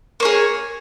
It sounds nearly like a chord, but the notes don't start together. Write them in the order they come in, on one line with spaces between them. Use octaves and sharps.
A#3 C#5 G#4